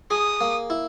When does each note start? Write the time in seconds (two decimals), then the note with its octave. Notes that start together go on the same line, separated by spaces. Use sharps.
0.11 G#4 D#6
0.41 A#3
0.70 E4